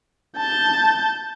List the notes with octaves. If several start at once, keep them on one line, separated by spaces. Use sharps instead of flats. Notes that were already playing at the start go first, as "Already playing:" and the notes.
A5 G6